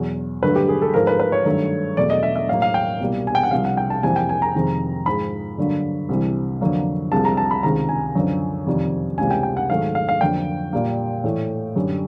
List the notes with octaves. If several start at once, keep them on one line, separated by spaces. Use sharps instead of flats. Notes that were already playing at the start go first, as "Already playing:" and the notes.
Already playing: E2 B2 F#3
G2 D3 F#3 A3 B4
G4
G#4
A4
G#2 F3 A3 A#4
B4
B4
C#5
G2 D#3 F#3 A3
E2 B2 F#3 A3 D5
D#5
E5
E5
A2 F#3 A#3 F5
F5
G5
C2 B2 G3 A#3
G#5
G5
F#5
C2 C3 F3 F5
F#5
G5
A5
F2 C3 E3 G3 A#3 G#5
G5
G#5
A#5
F2 C3 D#3 G#3
G#2 F3 G#3 B5
G2 D3 F#3 A#3
C2 C3 E3
F2 D3 F#3 A#3
C2 C3 F3 G#3 A5
A#5
A5
B5
C#2 C3 D#3 G#3 A#5
G#5
F#2 D3 F3
F2 C3 D#3 G3
C#2 C3 E3 G3 A#3 G#5
G5
G5
F#5
G#2 D#3 F#3 A3 F5
F5
F5
F2 D3 F#3 A#3 G5
A#2 G3 A#3
A2 E3 A3
F#2 D3 G3